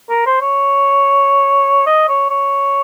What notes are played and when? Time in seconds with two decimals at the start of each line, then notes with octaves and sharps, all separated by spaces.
0.10 A#4
0.26 C5
0.41 C#5
1.87 D#5
2.09 C#5
2.30 C#5